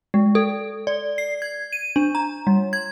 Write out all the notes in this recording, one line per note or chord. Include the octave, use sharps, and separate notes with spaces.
G#3
A4
D5
C7
G#6
D#7
D4
A#5
G3
G#6